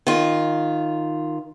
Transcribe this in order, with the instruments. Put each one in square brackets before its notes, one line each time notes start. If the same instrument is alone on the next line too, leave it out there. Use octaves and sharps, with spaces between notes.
[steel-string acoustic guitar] D#3 F4